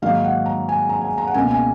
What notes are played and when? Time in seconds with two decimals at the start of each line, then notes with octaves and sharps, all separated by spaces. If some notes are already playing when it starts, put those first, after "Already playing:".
0.02 G#2 D#3 F#3 A#3 F5
0.24 F#5
0.46 A#5
0.69 G#5
0.89 A#5
1.01 G#5
1.18 A#5
1.27 F#5
1.34 C#2 B2 A#3 G#5
1.51 G#5